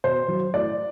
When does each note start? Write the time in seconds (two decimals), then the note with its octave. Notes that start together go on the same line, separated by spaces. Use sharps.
0.04 B2 C5
0.28 F#3
0.53 A2 D5